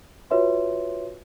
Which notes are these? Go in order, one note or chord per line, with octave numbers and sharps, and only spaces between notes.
F4 F#4 B4 C#5 E5 C6